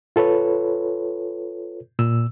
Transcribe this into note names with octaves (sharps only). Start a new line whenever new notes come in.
F4 A4 B4 C#5
A#2 E6